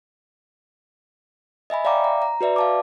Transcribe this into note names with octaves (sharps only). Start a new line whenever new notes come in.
D#5 E5 G#5 B5
D5 E5 F5 G5 A#5 D6
A#5
A#5
F#4 B4 D5 E5
F5 A5 D6